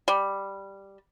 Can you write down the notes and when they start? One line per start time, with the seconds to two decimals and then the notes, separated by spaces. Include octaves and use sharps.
0.08 G3